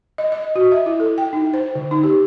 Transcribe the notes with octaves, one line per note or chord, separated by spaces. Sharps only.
D#5
D#5
F#4
E5
E4
A4
G5
D#4
C5
D3
D#4
G4